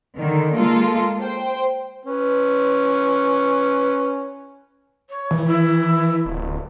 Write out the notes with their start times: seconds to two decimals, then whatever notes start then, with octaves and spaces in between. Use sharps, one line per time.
0.17 D3 D#3
0.56 G#3 A#3 F4 A4
1.22 C5 G5
2.06 C#4 B4
5.10 C#5
5.31 E3
5.47 E4
6.25 D1